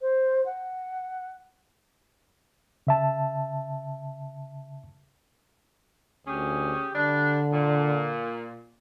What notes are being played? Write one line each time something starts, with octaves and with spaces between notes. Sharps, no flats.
C5
F#5
C#3 E5 A5
D2 C#4 G4 G#4
D3 G3 D4
A#2